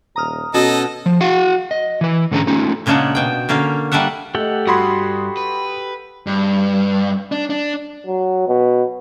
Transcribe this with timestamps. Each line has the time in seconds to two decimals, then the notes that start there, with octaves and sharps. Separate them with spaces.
0.16 D#1 A#5 D#6 F6
0.54 B2 C#4 A4 D#5
1.06 F3
1.21 F#4 F5 F#5
1.71 D#5
2.01 E3 B4
2.31 G#2 D3 C#4 D4 G#4 A#5
2.47 A3 C#4 D#4 F4
2.86 A#2 C#3 G#3 A#3 D4 F#5
3.15 B2 G5
3.49 D3 A#3 C#4 F5
3.92 G3 A#3 D4 E5 F#5
4.35 A3 G4 A4 D#5 F#5
4.67 G2 F#4 B5 C6 D#6 G#6
5.37 B4
6.27 G2
7.32 D4
7.50 D4
8.06 F#3
8.48 B2